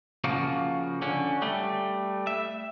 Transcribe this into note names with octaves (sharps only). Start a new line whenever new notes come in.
C#3 F3 A#3 F#4
D3 C#4
G3 A3
E5